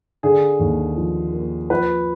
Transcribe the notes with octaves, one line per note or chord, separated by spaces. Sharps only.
D3 G#4
D#2
F3
A#3
F3 B4